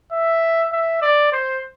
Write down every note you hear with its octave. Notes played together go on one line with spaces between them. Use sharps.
E5
E5
D5
C5